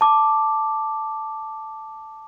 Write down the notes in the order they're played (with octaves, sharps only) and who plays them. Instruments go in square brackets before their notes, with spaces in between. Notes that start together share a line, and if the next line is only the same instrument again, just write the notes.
[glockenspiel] A5 D6